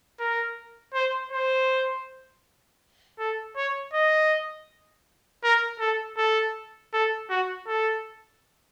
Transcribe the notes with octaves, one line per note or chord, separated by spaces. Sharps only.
A#4
C5
C5
A4
C#5
D#5
A#4
A4
A4
A4
F#4
A4